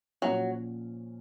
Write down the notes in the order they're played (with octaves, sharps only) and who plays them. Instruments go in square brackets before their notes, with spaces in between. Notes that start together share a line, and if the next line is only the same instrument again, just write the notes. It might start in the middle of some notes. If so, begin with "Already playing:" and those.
[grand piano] A#2 F3 A#3 C#4 [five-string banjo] F#3